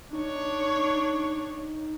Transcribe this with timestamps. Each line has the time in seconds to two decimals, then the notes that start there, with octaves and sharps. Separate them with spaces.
0.13 D4 D#4 C#5